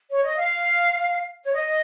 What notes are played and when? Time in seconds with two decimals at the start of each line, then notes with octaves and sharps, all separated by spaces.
0.11 C#5
0.24 D#5
0.37 F5
1.44 C#5
1.53 D#5